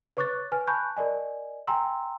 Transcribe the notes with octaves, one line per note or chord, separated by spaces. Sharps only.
B4 C#5 C#6 D6 F#6 A6
B4 G#5 F6
G#5 A5 B5 C#6 F#6 G6
A#4 D5 D#5 G#5
G5 G#5 A#5 C6 E6